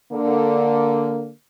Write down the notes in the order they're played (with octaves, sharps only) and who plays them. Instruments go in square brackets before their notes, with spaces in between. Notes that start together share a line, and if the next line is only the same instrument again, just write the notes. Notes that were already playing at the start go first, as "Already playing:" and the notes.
[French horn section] D3 A#3